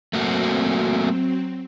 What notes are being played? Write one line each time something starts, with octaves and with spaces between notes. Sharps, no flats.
F#3 A3 A#3 C4 F#4